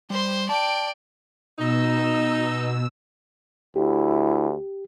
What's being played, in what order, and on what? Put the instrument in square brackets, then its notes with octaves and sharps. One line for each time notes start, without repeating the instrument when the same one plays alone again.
[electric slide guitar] G3 [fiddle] C5 C6
[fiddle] D5 G5 [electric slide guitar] A5
[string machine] B2 E6 [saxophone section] D#4
[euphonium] D2 [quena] E4 [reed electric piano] G4